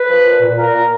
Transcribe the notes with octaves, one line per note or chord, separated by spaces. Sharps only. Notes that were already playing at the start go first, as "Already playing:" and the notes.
Already playing: B4
F3
A#2
A#2
A#2 A#4
A#2